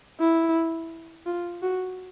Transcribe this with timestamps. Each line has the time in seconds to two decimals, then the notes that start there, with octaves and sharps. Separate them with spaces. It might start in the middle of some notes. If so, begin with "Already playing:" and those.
0.20 E4
1.26 F4
1.63 F#4